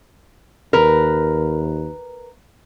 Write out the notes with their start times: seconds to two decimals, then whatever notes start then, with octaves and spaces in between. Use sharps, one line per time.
0.73 D#2 A#4 B4